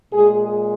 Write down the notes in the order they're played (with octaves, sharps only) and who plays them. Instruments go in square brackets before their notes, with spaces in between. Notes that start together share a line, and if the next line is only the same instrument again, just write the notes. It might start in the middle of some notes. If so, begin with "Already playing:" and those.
[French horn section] A#2 G#3 G#4